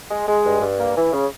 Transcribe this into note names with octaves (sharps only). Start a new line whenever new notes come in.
G#3
G#3
G2
G2
A#3
E3
C#3